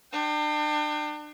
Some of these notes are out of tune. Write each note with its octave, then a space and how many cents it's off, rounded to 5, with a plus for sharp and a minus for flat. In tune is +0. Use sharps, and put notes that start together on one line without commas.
D4 +35 G5 +0